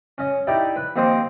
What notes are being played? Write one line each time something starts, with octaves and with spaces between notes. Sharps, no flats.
C#4 D#5
D#4 E4 G4 D5
B4
D#2 C4 C5 D#5 D6 D#6